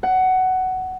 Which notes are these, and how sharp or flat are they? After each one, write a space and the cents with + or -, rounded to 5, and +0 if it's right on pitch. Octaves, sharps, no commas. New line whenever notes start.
F#5 +15